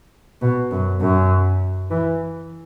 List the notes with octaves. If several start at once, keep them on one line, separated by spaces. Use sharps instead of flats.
B2
F#2
F#2
E3